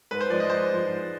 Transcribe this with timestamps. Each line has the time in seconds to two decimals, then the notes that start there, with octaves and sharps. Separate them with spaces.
0.11 G#2 B4
0.20 C5
0.30 F3 G#3 D5
0.40 D#5
0.49 G#2 C5
0.69 F3 G#3
0.89 G#2